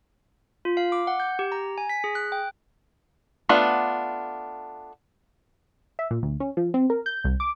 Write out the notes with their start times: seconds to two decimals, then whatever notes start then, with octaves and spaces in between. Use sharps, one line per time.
0.65 F4
0.77 F5
0.92 D6
1.07 F#5
1.20 G6
1.39 G4
1.52 A#5
1.78 G#5
1.89 B6
2.04 G#4
2.15 F#6
2.32 G5
3.49 A3 B3 D4 F4
5.99 E5
6.11 A#2
6.23 D2
6.40 C#4
6.57 F3
6.74 C4
6.90 A#4
7.06 G6
7.24 C2
7.40 D6